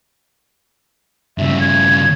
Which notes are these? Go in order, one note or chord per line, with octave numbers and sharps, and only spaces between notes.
G2 C#3 E5
G#6